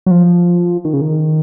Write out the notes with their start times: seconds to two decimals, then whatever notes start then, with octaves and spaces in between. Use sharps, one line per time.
0.06 F#3
0.11 F3
0.85 D#3
0.93 C#3
1.01 D#3